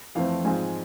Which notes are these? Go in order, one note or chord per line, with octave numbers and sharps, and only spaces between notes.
F2 E3 A3 C4 F5
G#2 F3 G#3 C4 F4 G#5